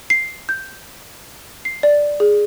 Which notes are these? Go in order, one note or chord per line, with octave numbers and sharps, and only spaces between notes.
C7
G6
C7
D5
G#4